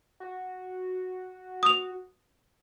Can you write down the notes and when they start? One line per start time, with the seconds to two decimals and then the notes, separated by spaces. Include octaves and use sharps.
0.20 F#4
1.63 D#6 F7